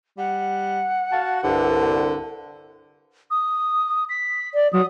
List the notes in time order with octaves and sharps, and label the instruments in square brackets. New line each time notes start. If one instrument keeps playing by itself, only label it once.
[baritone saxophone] G3 [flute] F#5
[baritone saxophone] F#4 [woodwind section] F5 A5
[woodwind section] C2 G2 [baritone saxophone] D3
[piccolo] D#6
B6
[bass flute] D5
[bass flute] F#3 [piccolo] D#6